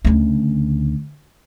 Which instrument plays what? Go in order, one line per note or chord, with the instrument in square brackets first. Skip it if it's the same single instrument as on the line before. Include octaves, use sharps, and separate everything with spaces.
[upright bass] D2 C#3